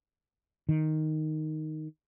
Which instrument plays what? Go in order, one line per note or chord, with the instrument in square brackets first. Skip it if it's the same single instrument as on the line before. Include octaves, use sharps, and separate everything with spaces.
[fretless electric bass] D#3